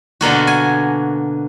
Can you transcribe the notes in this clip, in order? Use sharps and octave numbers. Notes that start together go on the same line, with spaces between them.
B2 D3 A#3 F#4
G#5